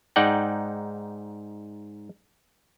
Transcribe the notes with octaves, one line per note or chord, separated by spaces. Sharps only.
G#2 D#4 D5 F#5 G5